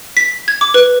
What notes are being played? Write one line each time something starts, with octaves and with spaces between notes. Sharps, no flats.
B6
G#6
D6
B4